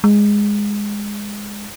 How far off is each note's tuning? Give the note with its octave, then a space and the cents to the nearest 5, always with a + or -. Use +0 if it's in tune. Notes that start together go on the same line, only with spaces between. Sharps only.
G#3 -10